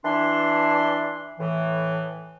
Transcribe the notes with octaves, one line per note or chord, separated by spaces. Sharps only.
E3 D4 C6
A2 E3